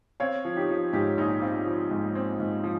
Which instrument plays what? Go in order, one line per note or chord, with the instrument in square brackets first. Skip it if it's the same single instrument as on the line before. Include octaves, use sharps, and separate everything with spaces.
[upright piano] C4 C#5 F5
F3
D#4 G4
F3
G#2 D#4 G4
A#1 D#4
C4 F4
F3
G#2
C4
G#2
F3